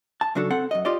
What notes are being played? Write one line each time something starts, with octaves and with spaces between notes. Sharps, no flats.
A5
C#3 F#3 D4 F#4 A4
C4 A4 F#5
F#2 D#5
F4 G4 D5 D#5